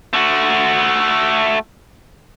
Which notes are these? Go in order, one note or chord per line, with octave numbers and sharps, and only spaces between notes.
A3 F#4